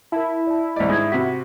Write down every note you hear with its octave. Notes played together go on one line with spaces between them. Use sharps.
E4 A#4 A5
D5 A5
C2 D5 D#5 B6
G#2 D#6 G#6
C3 F#4 B6